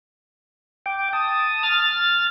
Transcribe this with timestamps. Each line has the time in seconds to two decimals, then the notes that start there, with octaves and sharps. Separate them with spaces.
0.86 G5 D6
1.13 A5 D#6
1.63 F6 A6